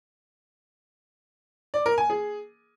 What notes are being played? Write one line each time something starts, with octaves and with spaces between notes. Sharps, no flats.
D5
A#4
G#5
G#4